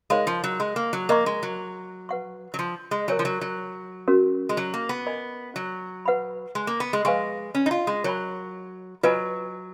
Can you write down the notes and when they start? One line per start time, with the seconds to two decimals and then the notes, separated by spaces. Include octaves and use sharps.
0.10 G#3 D#4 A#4 C#5 F5 B5
0.27 F3
0.44 F#3
0.60 G#3
0.76 A#3
0.93 F#3
1.09 A#3 A#4 D#5 A#5 C#6
1.26 G#3
1.43 F#3
2.09 B4 F#5 C#6
2.54 F#3
2.59 F3
2.91 G#3
3.08 F#3 A#4 C#5 G#5
3.19 F3
3.25 F#3
3.41 F#3
4.08 C#4 F#4 A#4
4.49 G#3
4.57 F#3
4.74 A#3
4.89 B3
5.06 A#4 D#5 G#5 B5
5.56 F#3
6.06 B4 F#5 B5
6.55 G#3
6.67 A#3
6.80 B3
6.93 G#3
7.05 G#3 B4 F5 G#5 C#6
7.55 C#4
7.66 D#4
7.71 F4
7.87 G#3
8.04 F#3 A#4 C#5 G#5 B5
9.03 F#3 F4 B4 D#5 G#5 B5